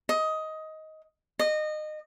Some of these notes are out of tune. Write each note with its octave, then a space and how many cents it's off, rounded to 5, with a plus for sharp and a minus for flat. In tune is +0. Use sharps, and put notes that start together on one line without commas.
D#5 +15
D#5 -25